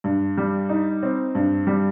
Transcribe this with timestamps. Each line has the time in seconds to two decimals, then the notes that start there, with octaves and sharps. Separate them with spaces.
0.04 G2
0.37 G3
0.69 D#4
1.03 C4
1.35 G2
1.67 G3